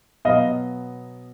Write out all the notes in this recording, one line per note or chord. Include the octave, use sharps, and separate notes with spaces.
B2 F#3 B3 D#5 F5